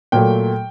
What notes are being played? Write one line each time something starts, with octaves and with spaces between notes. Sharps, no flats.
A#2 F#3 A3 G5